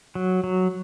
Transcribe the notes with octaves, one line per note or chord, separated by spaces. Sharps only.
F#3
F#3